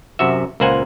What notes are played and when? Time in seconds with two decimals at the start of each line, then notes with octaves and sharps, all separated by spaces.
0.19 F#2 C3 F#4 E5
0.60 C#2 A#2 A#3 C5 F#5 G#5